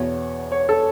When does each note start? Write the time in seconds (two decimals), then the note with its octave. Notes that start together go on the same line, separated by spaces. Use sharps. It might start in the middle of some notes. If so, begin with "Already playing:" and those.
Already playing: E2 B2 B3 C#5
0.52 C#5
0.69 A4